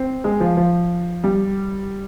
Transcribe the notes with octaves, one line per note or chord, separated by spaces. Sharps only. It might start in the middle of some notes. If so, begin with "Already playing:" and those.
Already playing: C4
G#3
F3
F3
G3